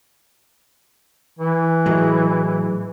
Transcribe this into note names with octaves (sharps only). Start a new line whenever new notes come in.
E3
A2 F#3 G#3